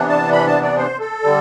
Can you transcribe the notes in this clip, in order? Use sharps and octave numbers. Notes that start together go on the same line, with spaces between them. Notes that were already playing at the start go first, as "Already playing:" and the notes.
Already playing: C3 E3 B3 D4
A5
B5
A5
D5
C5
A4
D3 G3